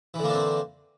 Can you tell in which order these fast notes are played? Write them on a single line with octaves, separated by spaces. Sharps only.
E3 D3 A#3 D4 C4